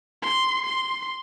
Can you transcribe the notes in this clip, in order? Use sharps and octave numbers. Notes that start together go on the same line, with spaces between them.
C6
C6